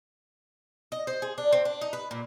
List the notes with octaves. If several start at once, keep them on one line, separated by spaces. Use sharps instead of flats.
D#5
C5
G#4
D4
C4
D4
D#4
B4
A#2